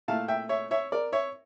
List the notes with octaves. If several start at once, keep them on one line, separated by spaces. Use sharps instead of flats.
A#2 A3 E4 F5 A5
E5 G5
C#5 E5
C#5 E5
A#4 D5
C#5 E5